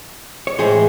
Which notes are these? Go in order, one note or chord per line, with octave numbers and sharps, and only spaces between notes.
C#5
A2 E3 G#3 G#4 C5